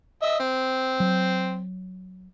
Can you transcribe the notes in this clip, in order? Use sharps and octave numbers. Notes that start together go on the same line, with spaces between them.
D#5 E5
C4
F#3